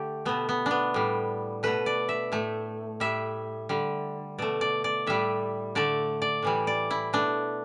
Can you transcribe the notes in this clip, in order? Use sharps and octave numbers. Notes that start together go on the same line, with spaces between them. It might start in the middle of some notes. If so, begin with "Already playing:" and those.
Already playing: D3 A3 G4 A4
B2 A3 B3
B3
B3 D4
A2 G3
B2 A3 B4
D5
E5
A2 A3
A2 G3 E5
D3 G3
B2 A3 D5
D5
D5
A2 G3 E5
D3 A3 D5
D5
A2 E3 G3
D5
E4
B2 A3 D4